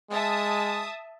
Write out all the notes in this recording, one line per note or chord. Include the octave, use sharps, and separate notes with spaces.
G#3 E5 A5 D#6